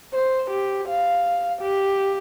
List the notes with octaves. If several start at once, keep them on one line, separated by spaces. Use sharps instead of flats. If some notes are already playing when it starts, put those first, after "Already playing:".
C5
G4
F5
G4